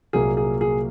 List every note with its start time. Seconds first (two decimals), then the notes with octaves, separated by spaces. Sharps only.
0.13 C2 A#2 F#3 A#3 G#4
0.37 G#4
0.61 G#4